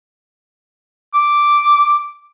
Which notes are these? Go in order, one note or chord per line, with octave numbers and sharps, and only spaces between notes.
D6